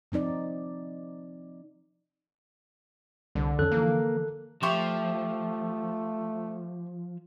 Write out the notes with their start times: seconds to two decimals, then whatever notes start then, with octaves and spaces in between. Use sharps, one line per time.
0.12 F3 C4 D#4 D5
3.35 C2 D3
3.59 F2 D#3 C#4 A4 F#6
3.71 D3 E3 F3 A#3
4.63 F3 A3 G4 E5 C#6